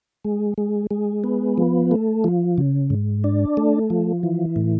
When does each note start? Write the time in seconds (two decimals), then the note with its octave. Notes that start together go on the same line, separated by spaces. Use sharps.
0.24 G#3
0.58 G#3
0.91 G#3
1.24 B3
1.58 F3
1.91 A3
2.24 F3
2.58 C#3
2.90 G#2
3.24 D4
3.57 A3
3.90 F3
4.23 E3
4.56 A2